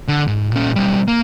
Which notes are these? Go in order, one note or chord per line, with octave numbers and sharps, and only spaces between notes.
D3
G#2
A#2 C#4
B1 G3
A#3